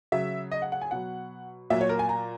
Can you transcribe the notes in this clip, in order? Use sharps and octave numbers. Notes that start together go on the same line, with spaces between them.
C#3 F#3 E5
D#5
F#5
F#5
G#5
B2 F#3 F#5
A#2 F#3 E5
C#5
A#4
G#5
A#5